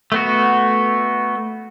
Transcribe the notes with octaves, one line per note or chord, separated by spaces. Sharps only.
A3 B3 F#4